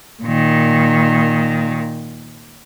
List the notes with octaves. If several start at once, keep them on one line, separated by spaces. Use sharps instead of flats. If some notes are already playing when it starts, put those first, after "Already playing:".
A#2 D#3